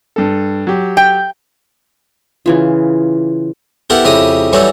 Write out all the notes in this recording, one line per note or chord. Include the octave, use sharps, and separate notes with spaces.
G2 A4
F#3 G4
G5
C#3 E3 F4
B3 E4 G4 A4 A#4 F#5
F2 C#3 E4 G4 A#5 D#6
E3 F#3 G3 D#4 A4 C#5